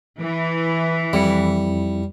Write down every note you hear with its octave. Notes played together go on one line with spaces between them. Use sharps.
E3
F2 G3 E4 C#7